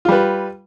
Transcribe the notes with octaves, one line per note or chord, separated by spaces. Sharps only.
G3 F4 B4